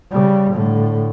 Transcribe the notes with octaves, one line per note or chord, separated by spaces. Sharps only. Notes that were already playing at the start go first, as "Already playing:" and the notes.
C#3 G3
A2 D3